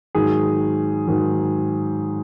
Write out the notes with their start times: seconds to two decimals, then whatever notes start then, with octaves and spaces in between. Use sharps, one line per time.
0.15 G#2 D#3 F#3 G#4
1.08 G#2 D#3 F#3